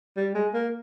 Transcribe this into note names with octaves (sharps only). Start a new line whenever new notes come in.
G3
G#3
A#3